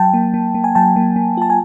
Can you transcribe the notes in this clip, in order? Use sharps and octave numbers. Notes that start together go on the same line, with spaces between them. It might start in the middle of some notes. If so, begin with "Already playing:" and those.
Already playing: F#3 G5 A5
A#3
A#3
A#3
G#5
F#3 G5 A5
A#3
A#3
F4 A5
G#5